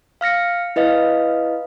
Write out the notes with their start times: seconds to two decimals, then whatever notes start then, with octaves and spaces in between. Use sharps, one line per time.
0.21 F5 F6 A#6 C#7
0.76 E4 B4 D#5 F5